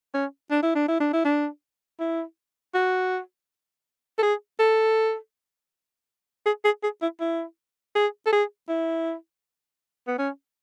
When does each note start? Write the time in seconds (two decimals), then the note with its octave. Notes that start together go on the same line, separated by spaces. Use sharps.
0.14 C#4
0.51 D4
0.63 E4
0.76 D4
0.88 E4
1.00 D4
1.13 E4
1.25 D4
2.00 E4
2.74 F#4
4.18 A4
4.23 G#4
4.59 A4
6.46 G#4
6.65 G#4
6.83 G#4
7.02 E4
7.20 E4
7.95 G#4
8.26 A4
8.32 G#4
8.69 E4
10.07 B3
10.19 C#4